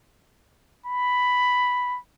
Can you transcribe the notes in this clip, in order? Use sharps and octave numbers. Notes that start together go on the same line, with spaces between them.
B5